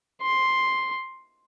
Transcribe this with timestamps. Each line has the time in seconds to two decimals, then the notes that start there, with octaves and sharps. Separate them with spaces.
0.22 C6